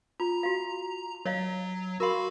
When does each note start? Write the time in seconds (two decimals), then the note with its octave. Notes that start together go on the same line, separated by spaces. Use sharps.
0.20 F4 A#5
0.43 F#4 F5
1.25 F#3 C#5 D#5 F5
2.00 F#4 A#4 F5 B5 C6